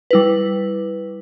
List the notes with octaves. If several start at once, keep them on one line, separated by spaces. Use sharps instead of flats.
G3 E4 B4